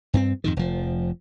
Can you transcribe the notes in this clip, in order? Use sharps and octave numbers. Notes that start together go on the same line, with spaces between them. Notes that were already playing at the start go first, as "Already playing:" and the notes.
G2 B3 C4
F2 G#2 D#3
F1 F3